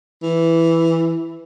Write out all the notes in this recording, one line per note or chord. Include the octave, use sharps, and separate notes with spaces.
E3